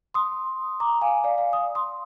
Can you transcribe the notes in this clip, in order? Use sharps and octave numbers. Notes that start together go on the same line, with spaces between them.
C6 D#6
A#5 D6
F5 G#5
D5 F5
D5 F5
D#6
C6 D#6